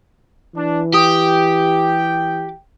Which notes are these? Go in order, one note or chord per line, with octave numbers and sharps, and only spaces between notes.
E3 D4
G4 G5 D#6